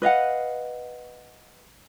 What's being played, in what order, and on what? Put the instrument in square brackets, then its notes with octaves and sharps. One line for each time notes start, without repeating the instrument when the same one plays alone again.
[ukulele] B4 D#5 F5 F#5